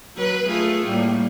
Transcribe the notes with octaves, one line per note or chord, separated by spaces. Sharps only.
F#3 B4
A3 F4 G#4
A2 G3 A#3